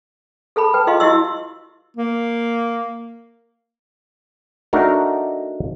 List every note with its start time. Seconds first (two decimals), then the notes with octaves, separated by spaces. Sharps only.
0.56 G#4 A4 A5 B5
0.74 B4 G5 A5
0.87 F4 G#4 D#5 F5 C6
1.00 E4 F#4 G4 D#5 C6 E6
1.97 A#3
4.73 A3 D4 D#4 F#4 A#4